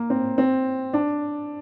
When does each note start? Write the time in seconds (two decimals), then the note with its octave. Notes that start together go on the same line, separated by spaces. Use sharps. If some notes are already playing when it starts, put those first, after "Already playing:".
Already playing: A#3
0.10 C4
0.38 C4
0.93 D4